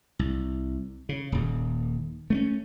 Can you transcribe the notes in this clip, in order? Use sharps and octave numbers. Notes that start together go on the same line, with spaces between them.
C2
C#3
D#1 D#2
A3 B3 C#4